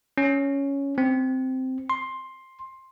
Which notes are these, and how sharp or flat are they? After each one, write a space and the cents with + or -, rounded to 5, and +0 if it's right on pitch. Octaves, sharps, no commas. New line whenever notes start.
C#4 +5
C4 -10
C6 +10